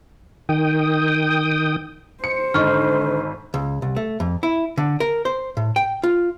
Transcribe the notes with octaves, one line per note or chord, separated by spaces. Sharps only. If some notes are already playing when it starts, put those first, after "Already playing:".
D#3 G5 D#6
C5 C#7
G#1 D3 D#5 C#6 F6
C#2
C2
A3
F2
E4
D3
A#4
C5
A2
G5
F4